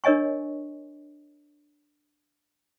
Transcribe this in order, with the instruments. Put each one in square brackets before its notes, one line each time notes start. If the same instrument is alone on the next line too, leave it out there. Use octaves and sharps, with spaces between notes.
[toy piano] D4 A#4 C#5 D#5 G#5 C#6